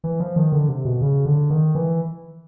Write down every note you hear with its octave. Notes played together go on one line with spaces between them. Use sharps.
E3
F3
D#3
D3
C3
B2
C#3
D3
D#3
E3